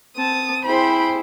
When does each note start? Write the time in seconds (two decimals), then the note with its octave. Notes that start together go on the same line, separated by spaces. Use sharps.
0.16 C4 A5 D#6
0.65 E4 G#4 C5 G5 B5